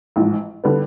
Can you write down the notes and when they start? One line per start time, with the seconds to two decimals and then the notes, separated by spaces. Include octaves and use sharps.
0.16 A1 G#2 F3
0.64 D3 G3 B3